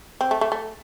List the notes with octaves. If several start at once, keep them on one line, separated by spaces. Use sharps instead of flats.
C4
A3
A3
A3